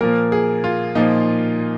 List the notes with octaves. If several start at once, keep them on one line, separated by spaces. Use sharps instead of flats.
A#2 F3 A#3 A#4
G#4
F4
A#2 F3 A#3 D#4